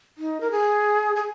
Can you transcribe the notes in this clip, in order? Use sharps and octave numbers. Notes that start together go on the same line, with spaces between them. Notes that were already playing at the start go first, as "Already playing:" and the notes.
D#4
A#4
G#4
G#4